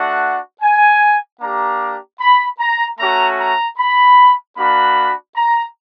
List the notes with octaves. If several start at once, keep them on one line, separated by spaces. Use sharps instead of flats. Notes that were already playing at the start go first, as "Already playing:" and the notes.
Already playing: A3 D4 F#4 F#5
G#5
A#3 D4 G4 A#5
B5
A#5
A3 C#4 F#4 A#5
A#5
B5
A#3 D4 F#4 B5
A#5